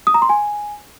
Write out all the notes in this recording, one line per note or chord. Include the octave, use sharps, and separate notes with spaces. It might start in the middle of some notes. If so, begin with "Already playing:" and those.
D#6
A#5
C6
G#5